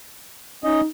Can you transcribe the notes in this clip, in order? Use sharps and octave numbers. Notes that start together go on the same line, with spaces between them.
C#4 D#4 D#5